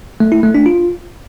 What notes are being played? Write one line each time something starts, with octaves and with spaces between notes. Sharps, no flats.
A3
E4
A3
D4
F4